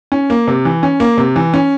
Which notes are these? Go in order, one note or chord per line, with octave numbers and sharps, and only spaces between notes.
C#4
A#3
C3
E3
C#4
A#3
C3
E3
C#4